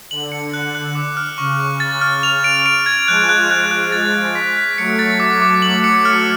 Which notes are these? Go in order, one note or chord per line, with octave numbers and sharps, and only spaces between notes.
D3 F#7
C#7
F#6
F#6
D6
F6
C#3 C#6
C#6
A6
F6
F7
D7
D7
G#6
F3 G#3 F#6
F#6
F#6
F#6
A6
A6
B6
B6
F#3 A3 C#7
A6
D6
D6
F#3 A3 F#7
C#7
F#3 A3 F6